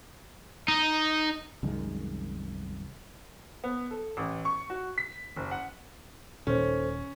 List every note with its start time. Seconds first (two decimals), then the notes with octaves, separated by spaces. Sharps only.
0.68 D#4
1.63 C2 F#2 D#3 G#3
3.64 B3
3.91 A4
4.17 A1
4.45 C#6
4.70 F#4
4.98 B6
5.36 F#1
5.51 F#5
6.47 D#1 A#2 D#3 C#4 A4 C5